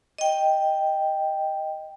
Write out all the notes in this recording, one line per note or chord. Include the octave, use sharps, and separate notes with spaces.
D#5 G5